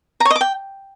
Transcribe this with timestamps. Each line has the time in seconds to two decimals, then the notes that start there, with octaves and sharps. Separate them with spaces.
0.20 A#5
0.25 C#5
0.31 D#5
0.36 D6
0.41 G5